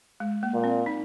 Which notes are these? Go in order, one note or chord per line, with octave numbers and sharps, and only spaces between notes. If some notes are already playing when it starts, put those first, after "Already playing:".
G#3
A#3
A#2
C4
D#4